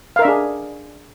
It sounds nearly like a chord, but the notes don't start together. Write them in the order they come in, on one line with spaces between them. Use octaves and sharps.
F5 A#4 E5 D4 G#4